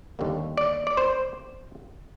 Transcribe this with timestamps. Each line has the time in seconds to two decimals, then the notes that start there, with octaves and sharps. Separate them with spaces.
0.19 D#2 D3 G3 A#3
0.57 D5
0.87 D5
0.97 C5